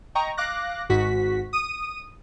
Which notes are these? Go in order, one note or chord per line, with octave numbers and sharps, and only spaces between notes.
D#5 G5 A#5 C#6
F5 D6 F#6 A#6
G#1 G#2 F#4 B6
D#6 D#7